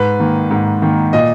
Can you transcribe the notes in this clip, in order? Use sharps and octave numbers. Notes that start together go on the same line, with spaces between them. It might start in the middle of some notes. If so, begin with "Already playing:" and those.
Already playing: G#2 B4
D#3 A#3
G#2
D#3 A#3
A#2 D#5